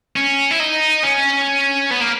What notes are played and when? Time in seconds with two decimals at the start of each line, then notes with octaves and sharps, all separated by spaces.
0.16 C#4
0.51 E4
0.60 D#4
1.03 C#4
1.91 B3
2.01 A#3